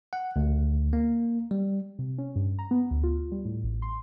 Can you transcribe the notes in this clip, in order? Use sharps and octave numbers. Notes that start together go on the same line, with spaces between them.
F#5
D2
A#3
G3
C3
C#4
G2
A#5
B3
D2
F4
G3
A2
A1
C6